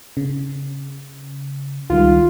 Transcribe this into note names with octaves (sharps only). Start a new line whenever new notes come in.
C#3
C#2 D#3 G3 F4